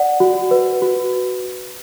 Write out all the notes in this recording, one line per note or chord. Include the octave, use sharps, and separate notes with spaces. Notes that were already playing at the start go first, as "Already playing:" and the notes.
Already playing: D5 F#5
F#4
B4
F#4